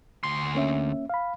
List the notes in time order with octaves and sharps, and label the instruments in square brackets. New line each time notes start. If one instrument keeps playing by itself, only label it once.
[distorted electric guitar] D2 C6
[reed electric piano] A#3 C#4 E5
F5 B5